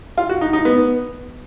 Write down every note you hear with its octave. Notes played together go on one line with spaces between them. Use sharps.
F4
F#4
D#4
D#4
B3